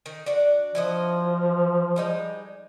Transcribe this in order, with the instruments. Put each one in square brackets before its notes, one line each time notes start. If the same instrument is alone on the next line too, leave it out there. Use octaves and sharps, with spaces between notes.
[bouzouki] D#3
D4 F#4 D5
[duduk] F3 [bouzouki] E4 F#4 D#5
[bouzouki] G3 G#3 D#4